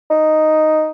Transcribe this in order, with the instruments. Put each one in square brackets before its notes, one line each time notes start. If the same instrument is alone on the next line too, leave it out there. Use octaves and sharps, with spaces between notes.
[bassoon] D#4